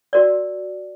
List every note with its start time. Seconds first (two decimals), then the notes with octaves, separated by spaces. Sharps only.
0.13 F#4 A#4 D5